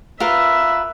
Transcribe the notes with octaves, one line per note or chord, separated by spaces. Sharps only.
F4 A#4 B4 E5